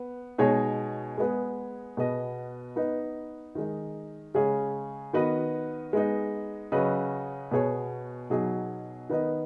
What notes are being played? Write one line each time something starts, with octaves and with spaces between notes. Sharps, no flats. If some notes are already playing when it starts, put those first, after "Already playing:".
Already playing: B3
B2 G#3 D#4 G#4 C#5
G#3 B3 G#4
B2 B3 G#4 D#5
B3 D#4 B4 D#5
D#3 G#3 D#4
C#3 G#3 C#4 G#4
D#3 B3 F#4 B4 D#5
G#3 B3 D#4
C#3 F#3 C#4 B4 D#5
B2 B3 G#4 C#5
B2 F#3 D#4 G#4
D#3 B3 D#4 B4 D#5